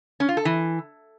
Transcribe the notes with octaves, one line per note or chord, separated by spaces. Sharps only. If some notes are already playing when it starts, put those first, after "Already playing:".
C#4
F4
A4
E3